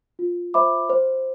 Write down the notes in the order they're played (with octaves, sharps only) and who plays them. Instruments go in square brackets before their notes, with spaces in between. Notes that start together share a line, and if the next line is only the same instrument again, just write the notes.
[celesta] F4
C5 E5 B5 D6
C5